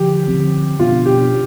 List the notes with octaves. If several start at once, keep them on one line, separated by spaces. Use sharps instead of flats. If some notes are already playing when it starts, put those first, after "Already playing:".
Already playing: D3 F3 G4
D3 F3 C4
B2 B3 D4 F4
G4